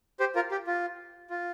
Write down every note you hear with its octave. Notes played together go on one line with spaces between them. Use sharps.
G4 C5
F4 A#4
G4
F4
F4